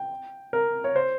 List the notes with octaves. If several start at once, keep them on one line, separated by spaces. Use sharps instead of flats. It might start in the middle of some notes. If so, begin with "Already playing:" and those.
Already playing: G5
A#4
C#5
C5